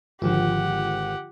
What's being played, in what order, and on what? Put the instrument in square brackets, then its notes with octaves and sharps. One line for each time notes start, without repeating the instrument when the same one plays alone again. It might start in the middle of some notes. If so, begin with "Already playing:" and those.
[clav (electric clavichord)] G#1 [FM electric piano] D3 F3 F4 [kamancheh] G4 F#5